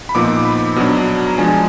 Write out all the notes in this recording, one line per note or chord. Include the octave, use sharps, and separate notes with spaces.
B5
A#2 F3 B3 D#4 D6
B5
B2 F#3 B3 D4
A#5
F3 G#3 D4 G#5